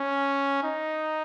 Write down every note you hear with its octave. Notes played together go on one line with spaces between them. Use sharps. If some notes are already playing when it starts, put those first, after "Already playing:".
Already playing: C#4
D#4